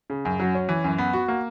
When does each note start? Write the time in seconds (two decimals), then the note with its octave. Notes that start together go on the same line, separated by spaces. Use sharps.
0.10 C#3
0.25 F#2
0.40 F#3
0.55 C#4
0.69 E3
0.84 F#2
0.98 B3
1.13 F#4
1.28 A#3